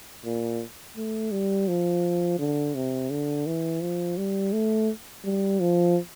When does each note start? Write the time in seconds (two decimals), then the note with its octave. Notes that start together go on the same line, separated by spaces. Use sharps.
0.25 A#2
0.97 A3
1.31 G3
1.68 F3
2.39 D3
2.75 C3
3.10 D3
3.46 E3
3.81 F3
4.17 G3
4.53 A3
5.24 G3
5.61 F3